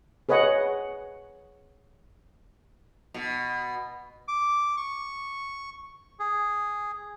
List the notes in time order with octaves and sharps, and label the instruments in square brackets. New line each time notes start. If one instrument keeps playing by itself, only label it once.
[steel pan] G#4 B4 C#5 D#5 F#5
[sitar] B2
[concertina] D6
C#6
G#4